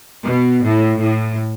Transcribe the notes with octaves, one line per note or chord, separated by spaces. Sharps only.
B2
A2
A2